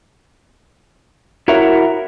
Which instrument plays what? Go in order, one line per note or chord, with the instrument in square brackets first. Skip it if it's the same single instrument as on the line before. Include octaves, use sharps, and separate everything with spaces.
[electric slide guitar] E4 F#4 A#4 C#5 E5